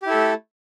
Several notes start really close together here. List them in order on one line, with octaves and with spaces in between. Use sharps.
G4 E4 A4 A3